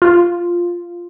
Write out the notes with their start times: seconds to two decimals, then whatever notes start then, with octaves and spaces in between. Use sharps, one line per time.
0.02 F4